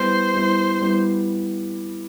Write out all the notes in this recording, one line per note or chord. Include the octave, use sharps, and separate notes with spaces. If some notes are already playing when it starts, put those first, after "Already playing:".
Already playing: G3 B3 E4 C5
G3 B3 E4
G3 B3 E4